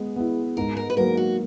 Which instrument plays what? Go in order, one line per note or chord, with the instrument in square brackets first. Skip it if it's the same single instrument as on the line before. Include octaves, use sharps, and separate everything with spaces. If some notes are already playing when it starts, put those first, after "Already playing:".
Already playing: [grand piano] G#3 B3 [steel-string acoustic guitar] G#4
[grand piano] B3 E4
[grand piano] G#2 [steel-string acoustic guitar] A#4
[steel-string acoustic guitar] A#4
B4
[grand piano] F#3 A#3 [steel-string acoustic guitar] A#4
[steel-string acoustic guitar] F#4